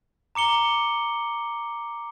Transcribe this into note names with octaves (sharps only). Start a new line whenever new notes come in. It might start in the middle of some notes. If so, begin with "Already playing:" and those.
A#5 D6 C#7 G7